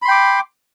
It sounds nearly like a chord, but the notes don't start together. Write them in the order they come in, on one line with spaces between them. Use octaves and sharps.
B5 C6 G5 D6